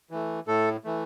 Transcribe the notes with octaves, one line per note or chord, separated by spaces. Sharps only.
E3 A3
A2 A3 A4
E3 A3